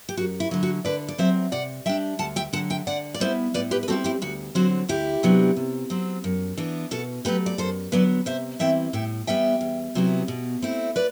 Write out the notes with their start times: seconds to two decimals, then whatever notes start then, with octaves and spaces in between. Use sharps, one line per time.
0.09 G4
0.17 F#2 F#4
0.40 E4
0.51 D3 F#3
0.63 F#4
0.85 D3 B4 D5
1.08 D5
1.18 F#3 C4 C5 E5
1.52 C3 D5 F#5
1.86 G3 D4 E5 G5
2.19 D2 F#5 A5
2.36 E5 G5
2.53 D3 F#5 A5
2.56 F#3
2.70 E5 G5
2.87 D3 D5 F#5
3.14 D5
3.20 G3 B3 E4 C5 E5
3.54 A2 B4 D5
3.71 G4 B4
3.83 B4
3.88 G3 C4 E4 F#4 A4
4.04 E4 G4
4.22 D2 F#4
4.55 D3 F#3 C4 F#4
4.89 D2 E4 G4
5.23 C3 F#3 B3 D4
5.56 C3
5.90 F#3 C4
6.24 F#2
6.57 E3 B3 D4
6.91 B2 F#4 A4
7.25 F#3 A3 G4 B4
7.46 D5
7.58 F#2 A4 C5
7.92 D3 F#3 B3 B4 D5
8.26 C3 C5 E5
8.59 E3 G3 C4 E4 E5 G5
8.93 A2 E5 G5
9.27 E3 G3 B3 E5 G5
9.61 E2
9.95 C3 F#3 B3 E4
10.28 B2
10.62 A3 C4 E4
10.96 B4 D5